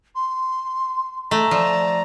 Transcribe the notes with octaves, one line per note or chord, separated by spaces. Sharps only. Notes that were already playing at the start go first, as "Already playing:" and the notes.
C6
A3 A#5
F3 D5